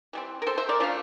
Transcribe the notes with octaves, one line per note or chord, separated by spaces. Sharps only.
E3 G3 C4
A#4
A4 C5
C5 E5
A#4 D5
F3 A3 D4 F5